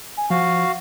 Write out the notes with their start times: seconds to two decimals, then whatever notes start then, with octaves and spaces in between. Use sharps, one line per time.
0.17 G#5
0.30 F3 F#4 F5